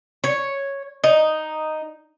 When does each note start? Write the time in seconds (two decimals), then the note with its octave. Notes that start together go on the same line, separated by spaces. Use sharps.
0.24 C#5
1.04 D#4